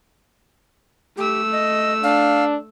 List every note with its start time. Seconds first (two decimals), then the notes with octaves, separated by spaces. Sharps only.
1.17 A3 G4 E6
1.52 D#5
2.03 D4 F5